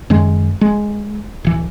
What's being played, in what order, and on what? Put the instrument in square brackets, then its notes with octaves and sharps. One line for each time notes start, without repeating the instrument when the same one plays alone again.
[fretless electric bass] F#2 D#3 G#3
G#3
D1 E3